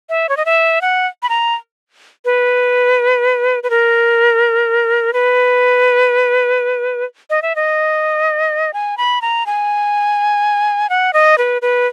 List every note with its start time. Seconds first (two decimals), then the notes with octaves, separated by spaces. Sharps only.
0.09 E5
0.29 C#5
0.37 D#5
0.45 E5
0.81 F#5
1.23 B5
1.29 A#5
2.25 B4
3.63 B4
3.70 A#4
5.13 B4
7.30 D#5
7.42 E5
7.56 D#5
8.73 G#5
8.98 B5
9.22 A#5
9.46 G#5
10.90 F#5
11.13 D#5
11.38 B4
11.62 B4